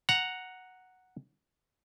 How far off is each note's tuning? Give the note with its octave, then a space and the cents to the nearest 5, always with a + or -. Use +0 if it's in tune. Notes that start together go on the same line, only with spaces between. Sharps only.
F#5 +0 A#5 +0